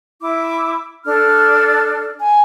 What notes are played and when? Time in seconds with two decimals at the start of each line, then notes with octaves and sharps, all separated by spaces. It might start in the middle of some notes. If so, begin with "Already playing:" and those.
0.20 E4 D6
1.04 D4 A4 F6
2.20 G#5